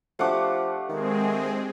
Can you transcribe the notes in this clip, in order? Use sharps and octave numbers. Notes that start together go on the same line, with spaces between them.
F3 A3 D4 G4 F5 F#5 D6
D#3 G#3 C4 G#4